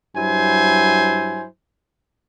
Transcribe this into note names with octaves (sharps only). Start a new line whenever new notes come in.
G2 F#3 E4 C5 G#5